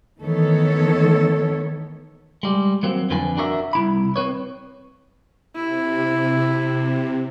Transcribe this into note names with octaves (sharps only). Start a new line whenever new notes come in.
D#3 E3 A3 B3 A4 C#5
G3 G#3
F#3 A#3 C4
F2 D3 F3 F4 B4 G#5
D4 F#4 A#4 C#5 E5
C2 E4 B5
C4 B4 C#5
C3 E4